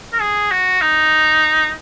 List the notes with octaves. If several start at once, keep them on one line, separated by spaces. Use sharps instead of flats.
A#4
G#4
F#4
D#4